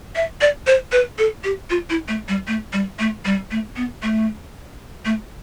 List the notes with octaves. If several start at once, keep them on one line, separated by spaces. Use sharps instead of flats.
E5
D5
C5
B4
A4
G4
F4
E4
A3
G3
A3
G3
A3
G3
A3
B3
A3
A3